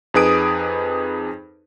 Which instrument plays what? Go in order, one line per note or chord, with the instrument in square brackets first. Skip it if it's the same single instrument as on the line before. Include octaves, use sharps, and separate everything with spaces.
[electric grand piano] F2 D#4 G#4 B4 D#6 D7